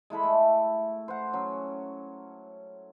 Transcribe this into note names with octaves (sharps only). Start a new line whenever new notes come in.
G#3 E4 A4 B5
A3
C5 F#5
F#3 C#4